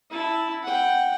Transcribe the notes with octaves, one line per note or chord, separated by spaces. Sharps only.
E4 A5
F#5 G5